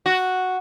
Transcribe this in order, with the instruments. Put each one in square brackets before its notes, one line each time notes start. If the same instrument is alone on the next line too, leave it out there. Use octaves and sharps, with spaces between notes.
[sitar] F#4